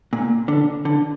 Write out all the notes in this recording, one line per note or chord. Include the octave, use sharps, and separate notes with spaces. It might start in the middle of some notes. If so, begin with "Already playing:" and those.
A#2
D3
D3